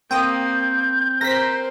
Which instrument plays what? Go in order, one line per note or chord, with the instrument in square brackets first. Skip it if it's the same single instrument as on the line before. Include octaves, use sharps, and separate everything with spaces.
[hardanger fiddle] A#3 [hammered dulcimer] C4 [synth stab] G5 D#6 [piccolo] G6
[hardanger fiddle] C4 C5 [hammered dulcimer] A#4 [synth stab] A#6 B6